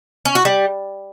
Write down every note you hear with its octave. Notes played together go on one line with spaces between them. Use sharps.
C#4
F#4
G3